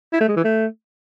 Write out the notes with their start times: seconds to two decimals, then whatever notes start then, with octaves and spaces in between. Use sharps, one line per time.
0.13 E4
0.21 A3
0.29 G#3
0.36 E3
0.44 A3